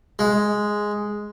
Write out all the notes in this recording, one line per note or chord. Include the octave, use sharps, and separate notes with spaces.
G#3